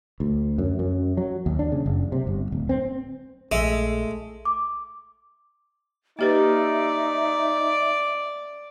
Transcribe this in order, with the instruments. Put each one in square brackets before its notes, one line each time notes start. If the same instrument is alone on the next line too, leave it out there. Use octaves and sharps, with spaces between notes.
[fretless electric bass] D2
F#2
F#2
F#3
D#2
D4
C#3
F#1
C3
G1
D1
C4
[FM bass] A#1 [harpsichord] G#3 [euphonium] A3 [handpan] E5
[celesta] D6
[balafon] A#3 G4 B4 [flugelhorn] D#4 [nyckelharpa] D5 [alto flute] E5